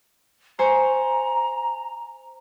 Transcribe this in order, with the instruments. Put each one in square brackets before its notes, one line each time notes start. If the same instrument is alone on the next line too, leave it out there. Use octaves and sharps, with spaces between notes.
[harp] C5 G#5 C#6 [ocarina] A#5